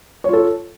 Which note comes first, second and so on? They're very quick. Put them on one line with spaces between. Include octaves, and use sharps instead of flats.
C#5 F4 A4